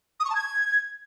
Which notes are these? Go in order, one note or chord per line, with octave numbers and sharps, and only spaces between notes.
D#6
C#6
A5
G#6